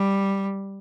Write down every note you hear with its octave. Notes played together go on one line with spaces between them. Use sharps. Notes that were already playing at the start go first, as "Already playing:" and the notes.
Already playing: G3